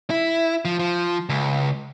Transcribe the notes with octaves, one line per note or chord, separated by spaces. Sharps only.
E4
F3
F3
C#2